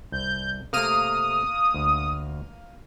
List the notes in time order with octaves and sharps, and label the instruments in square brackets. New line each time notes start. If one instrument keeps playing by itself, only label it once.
[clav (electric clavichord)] C2 [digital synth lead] G6
[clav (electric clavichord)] C3 A3 [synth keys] A#3 F6 D#7 [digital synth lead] D#6
[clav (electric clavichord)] D2